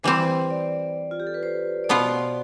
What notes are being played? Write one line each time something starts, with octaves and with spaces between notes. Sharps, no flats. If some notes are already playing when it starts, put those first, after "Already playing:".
E3 G3 C4 C5
D5
F4
G4
A4
B4
C5
D5
B2 B3 F4 C5